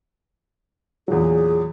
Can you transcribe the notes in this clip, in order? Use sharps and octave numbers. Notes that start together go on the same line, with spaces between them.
E2 A#2 F#3 G#4